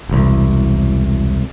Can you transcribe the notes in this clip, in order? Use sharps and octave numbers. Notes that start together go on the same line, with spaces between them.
E1 C2